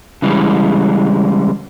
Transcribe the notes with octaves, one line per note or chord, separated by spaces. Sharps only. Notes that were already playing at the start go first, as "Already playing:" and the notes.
C#3 E3 G3 G#3